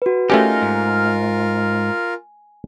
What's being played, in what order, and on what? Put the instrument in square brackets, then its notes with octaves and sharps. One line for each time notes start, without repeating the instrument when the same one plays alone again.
[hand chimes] F#4 B4
[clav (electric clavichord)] A3 C#4 G4 [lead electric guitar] D#4 [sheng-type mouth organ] F4 A#4 [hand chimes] G#5
[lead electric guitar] G#2